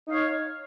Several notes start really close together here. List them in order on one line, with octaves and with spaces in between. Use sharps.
D#4 F5 C#5